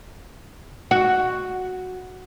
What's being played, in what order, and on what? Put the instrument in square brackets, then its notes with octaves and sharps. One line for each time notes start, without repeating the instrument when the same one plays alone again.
[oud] F#4